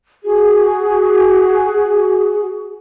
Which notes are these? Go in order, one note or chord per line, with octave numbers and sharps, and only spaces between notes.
F#4 G#4